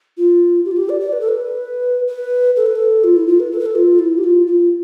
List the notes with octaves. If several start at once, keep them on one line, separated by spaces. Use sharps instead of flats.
F4
G4
F4
G4
D5
D5
B4
A4
B4
B4
A4
B4
A4
F4
E4
F4
B4
A4
B4
A4
F4
E4
G4
F4
F4